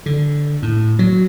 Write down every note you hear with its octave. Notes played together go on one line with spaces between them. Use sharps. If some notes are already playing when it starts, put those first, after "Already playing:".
D3
A2
F#3